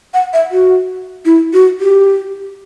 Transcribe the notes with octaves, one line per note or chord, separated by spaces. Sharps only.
F#5
E5
F#4
E4
F#4
G4